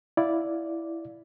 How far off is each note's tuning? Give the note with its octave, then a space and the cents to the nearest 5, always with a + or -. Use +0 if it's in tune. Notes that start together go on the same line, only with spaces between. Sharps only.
E4 +0 D5 -5 F5 +15